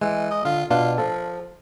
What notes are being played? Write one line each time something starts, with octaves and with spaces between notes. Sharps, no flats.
E3 G#3
D#5
D3 F4
B2 D4 F4 F#5
F3 A4